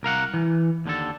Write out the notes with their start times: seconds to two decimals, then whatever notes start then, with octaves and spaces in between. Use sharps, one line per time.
0.03 C2 A#4 F5 F#5
0.34 E3
0.86 D#2 D3 A4